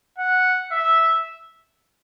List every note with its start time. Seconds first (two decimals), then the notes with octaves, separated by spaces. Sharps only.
0.18 F#5
0.71 E5